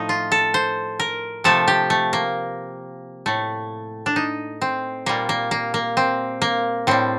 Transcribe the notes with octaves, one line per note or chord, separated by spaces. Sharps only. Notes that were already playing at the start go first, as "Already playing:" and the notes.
Already playing: A2 F3 A3 D#4
F4
A4
C5
A#4
C3 F3 A3 A4
G4
A3
A#3
A2 A3
D4
D#4
C4
A#2 G3 A#3
A#3
A#3
A#3
C4
A#3
A2 G3 C4